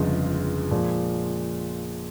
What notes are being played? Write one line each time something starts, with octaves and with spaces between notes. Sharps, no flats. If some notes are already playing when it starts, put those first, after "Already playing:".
Already playing: G1 F2 C#3 F3 G#3
A#2 F3 G#3